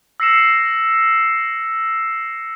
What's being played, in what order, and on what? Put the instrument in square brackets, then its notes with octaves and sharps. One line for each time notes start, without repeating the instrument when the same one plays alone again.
[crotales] E6 A#6 C7 C#7 E7